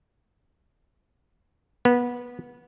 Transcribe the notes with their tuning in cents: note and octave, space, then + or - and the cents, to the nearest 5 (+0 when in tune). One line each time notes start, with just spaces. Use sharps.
B3 -20